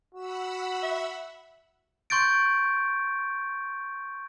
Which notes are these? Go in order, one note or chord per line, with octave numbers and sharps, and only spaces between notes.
F#4 F#5 B5 E6
E5
C6 C#6 G6 A6 D7